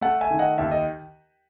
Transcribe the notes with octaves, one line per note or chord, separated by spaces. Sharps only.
A3 F#5 A5
E5 G#5
D#3
D#5 F#5
D#2 E5
D#5